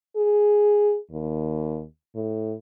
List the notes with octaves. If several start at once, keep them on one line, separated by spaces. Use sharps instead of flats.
G#4
D#2
A2